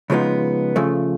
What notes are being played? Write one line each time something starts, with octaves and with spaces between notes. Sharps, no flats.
C#3 F3 G#3 B3 D#4
C#3 F3 A3